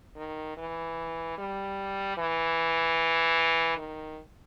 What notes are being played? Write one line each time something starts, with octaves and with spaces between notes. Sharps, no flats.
D#3
E3
G3
E3
D#3